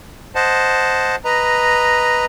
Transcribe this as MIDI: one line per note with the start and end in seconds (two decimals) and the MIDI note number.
0.35 1.16 72
0.35 1.16 75
0.35 1.16 78
0.35 1.16 81
1.25 2.25 71
1.25 2.25 75
1.25 2.25 82